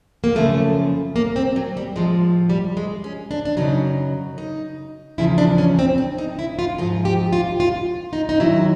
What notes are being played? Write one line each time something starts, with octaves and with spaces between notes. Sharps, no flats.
A#3
F#2 C#3 F3 A3
A#3
C4
F#3
G3
A2 F3 G#3
G3
G#3
C#4
D4
D4
F#2 C#3 F#3 D#4
D#4
E2 C#3 F3 E4
D4
C#4
C4
D4
D#4
E4
F4
G#2 F3 F#4
G4
F4
F4
D#4
D#4
F#2 D#3 F#3 E4